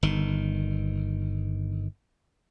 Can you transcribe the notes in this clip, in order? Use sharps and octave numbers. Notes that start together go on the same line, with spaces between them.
G1 D#3